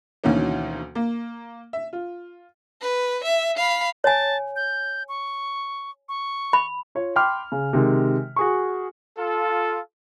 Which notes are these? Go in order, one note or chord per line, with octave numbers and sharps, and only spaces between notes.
D2 B2 D#3 E3 A#3 C#4
A#3
E5
F4
B4
E5
F5 B5
C#5 G#5 A5
G6
C#6
C#6
B5
F4 C#5
G5 B5 C6 D6 F6
C#3
C3 D#3 G#3
F#4 G#4 C#6
F4 A4